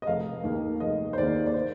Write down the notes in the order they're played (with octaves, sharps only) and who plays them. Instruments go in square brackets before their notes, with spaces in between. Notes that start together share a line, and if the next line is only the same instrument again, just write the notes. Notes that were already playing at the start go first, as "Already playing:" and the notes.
[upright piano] D#5
F1 F5
D#2 D#3 A#3
F1 D#5
C5
D#2 D#3 A#3 D5
D5
C5